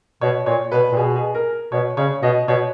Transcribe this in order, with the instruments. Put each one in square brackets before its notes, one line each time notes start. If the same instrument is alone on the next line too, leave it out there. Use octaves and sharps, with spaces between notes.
[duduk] B2 [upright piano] C#5
[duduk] A#2 [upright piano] C#5
[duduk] B2 [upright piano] B4
[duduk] A#2
[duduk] B2 [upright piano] G#4
[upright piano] G#4
A#4
[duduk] B2 [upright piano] C#5
[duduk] C#3 [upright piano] C#5
[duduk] B2 [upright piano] D#5
[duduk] B2 [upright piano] C#5